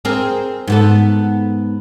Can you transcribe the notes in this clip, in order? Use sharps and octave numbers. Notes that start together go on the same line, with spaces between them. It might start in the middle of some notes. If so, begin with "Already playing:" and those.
C4 G#4 A#4
G#2 B3 A4